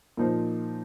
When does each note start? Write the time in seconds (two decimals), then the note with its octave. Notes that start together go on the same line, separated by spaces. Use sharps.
0.17 A#2 F3 D#4 C5